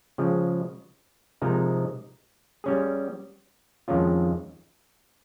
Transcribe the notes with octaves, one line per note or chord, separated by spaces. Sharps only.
C#3 F3 G#3
C3 F3 G#3 D#4 A#4
G3 C#4 G#4
F2 D#3 G#3 C#4 F4